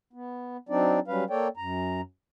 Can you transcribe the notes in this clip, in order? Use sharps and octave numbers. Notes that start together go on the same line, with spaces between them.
B3
F#3 C4 D4 D#4 D5
F#3 G3 C#4 B4 F5
A#3 A4 C#5 D5 G5
F#2 A#5